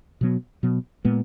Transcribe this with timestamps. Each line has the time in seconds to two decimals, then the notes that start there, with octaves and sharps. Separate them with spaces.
0.21 B2 F#3 B3
0.63 B2 F#3 B3
1.05 A#2 G#3 B3